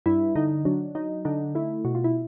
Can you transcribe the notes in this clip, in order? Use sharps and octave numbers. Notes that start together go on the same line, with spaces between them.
G2 E4
D3 D#4
F#3 D4
F#3 D#4
D3 D#4
A3 E4
B2 F#4
F4
E4